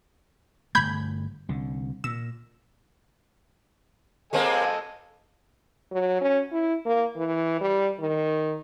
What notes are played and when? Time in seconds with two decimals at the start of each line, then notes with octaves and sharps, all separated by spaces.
0.75 G1 E2 A3 B5 G6 G#6
1.49 C2 D3
2.04 A#2 E6
4.33 G#3 A#3 C4 A4 D#5 G#5
5.91 F#3
6.21 C#4
6.52 E4
6.86 A#3
7.16 E3
7.61 G3
8.00 D#3